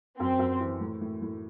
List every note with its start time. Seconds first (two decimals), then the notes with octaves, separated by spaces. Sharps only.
0.19 F#2 C4
0.39 F#2
0.61 E3
0.81 A2
1.01 A2
1.22 A2